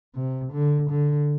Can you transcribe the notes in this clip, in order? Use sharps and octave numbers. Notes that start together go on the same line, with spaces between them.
C3
D3
D3